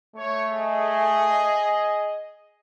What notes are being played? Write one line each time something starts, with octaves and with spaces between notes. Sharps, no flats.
A3 C#5
G#4 D#5